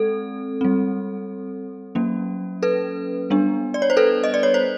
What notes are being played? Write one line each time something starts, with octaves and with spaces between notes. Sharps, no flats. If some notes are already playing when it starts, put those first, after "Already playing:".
Already playing: G#3 C4 A4
G3 C4
F#3 A#3 C#4
A4 B4
G3 B3 D4
D5
C#5
C5
A4 B4
D#5
D5
C#5
C5